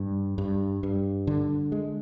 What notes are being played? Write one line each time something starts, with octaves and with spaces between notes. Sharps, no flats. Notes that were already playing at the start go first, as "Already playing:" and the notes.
Already playing: G2
G2
G2
D3
G#3